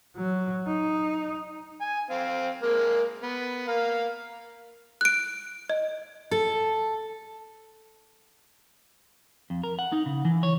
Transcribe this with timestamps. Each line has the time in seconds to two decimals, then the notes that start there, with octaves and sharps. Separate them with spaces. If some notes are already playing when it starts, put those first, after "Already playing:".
0.16 F#3
0.67 D#4
1.81 G#5
2.11 C4 F5
2.63 G#3 A#3 A#4
3.23 B3
3.68 A#4 F5
5.01 F#6 D7
5.70 D#5
6.31 A4
9.50 F2
9.64 A#4
9.79 F#5
9.92 D#4
10.06 C#3
10.25 E3
10.43 C#5